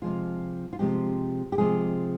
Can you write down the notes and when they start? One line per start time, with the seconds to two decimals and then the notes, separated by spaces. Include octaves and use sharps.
0.02 C3 F3 G#3 F4
0.73 F4
0.79 C3 F3 G#3 G4
1.52 G4
1.58 C3 F3 G#3 G#4